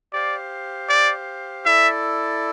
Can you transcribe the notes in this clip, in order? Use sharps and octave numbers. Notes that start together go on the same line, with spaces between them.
G4 C5 D5 F5
D5
E4 A4 D5 E5